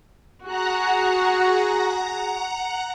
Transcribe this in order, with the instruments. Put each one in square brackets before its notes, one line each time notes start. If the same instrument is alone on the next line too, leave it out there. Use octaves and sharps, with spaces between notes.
[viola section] F#4 G#4 [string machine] F#5 A#5 F#6